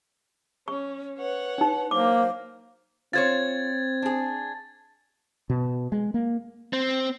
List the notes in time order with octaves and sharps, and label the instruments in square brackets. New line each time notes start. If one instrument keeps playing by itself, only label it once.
[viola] C#4 [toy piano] C#6
[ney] B4 [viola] C#5 F#5
[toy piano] D4 D#4
[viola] F#3 [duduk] A#3 [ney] C5 [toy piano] D6
[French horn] C4 [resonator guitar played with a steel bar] F4 C5 C#5 [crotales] G#6 A6
[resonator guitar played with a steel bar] D4 G#4
[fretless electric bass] B2
G#3
A#3
[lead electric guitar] C4